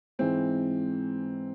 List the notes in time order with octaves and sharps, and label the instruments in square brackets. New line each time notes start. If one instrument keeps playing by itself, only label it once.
[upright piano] G#2 E3 G#3 C4